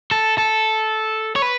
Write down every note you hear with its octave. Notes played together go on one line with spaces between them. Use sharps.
A4
A4
C#5
B4